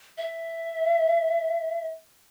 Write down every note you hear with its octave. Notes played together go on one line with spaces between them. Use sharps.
E5